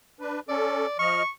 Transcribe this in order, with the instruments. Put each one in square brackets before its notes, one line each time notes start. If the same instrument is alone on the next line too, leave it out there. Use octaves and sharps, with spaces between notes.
[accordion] D4 B4
[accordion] C#4 A4 [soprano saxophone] D5
[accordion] F3 D#5 F6 [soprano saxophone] C#6